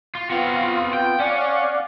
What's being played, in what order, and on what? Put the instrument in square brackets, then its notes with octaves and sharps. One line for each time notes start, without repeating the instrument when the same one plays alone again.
[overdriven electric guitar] F4
[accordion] B3 C4 F4 [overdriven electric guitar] F#4 F5
[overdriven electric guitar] G5
[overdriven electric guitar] C#4 [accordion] D5 F5 F#5